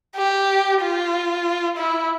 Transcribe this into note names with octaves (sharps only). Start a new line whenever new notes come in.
G4
F4
E4